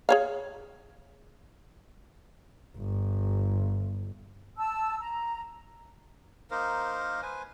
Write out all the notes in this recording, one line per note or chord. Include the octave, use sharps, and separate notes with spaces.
G#4 C#5 F5
G1
A5 E6
A#5
A#3 D#4 A#4 C5
B4 C5 G#5